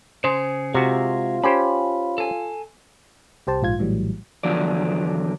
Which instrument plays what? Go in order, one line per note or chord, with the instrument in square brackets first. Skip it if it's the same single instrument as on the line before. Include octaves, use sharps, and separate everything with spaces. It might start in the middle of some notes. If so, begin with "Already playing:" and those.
[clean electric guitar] C#3 G#4 [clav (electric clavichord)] C5
[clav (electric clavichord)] C3 F#4 [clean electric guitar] G#3 G#4 A#4 [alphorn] F4
[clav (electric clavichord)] C#4 G4 C5 [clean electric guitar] B5
[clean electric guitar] A4 G#5
[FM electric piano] C2 G4 C5 A5
A#1 G#2 F4 G#6
A#1 A2 E3 F#3 G3
[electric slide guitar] E2 D3 F3 F#3 D5